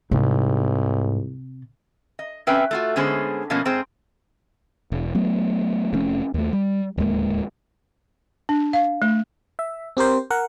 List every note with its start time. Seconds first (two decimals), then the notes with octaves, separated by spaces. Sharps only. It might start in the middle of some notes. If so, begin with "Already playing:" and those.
0.11 C2 G#2 C3
2.19 D#5
2.47 C4 C#4 B4 E5 G5
2.71 A3 F4 F#4
2.96 D3 G#3 B3 C#4 G#4 C5
3.50 B2 F3 A#3 B3 C#4
3.65 G#2 C4 G#4 C5
4.92 E1
5.15 F#3 A3 B3
5.93 F1 F2 A3 C#4
6.34 D#2 A3
6.53 G3
6.98 D1 D#2 G#3 A#3
8.49 D4
8.73 F5
9.02 A3
9.59 E5
9.97 C4 G4 A#4 C5
10.30 A#4 F#5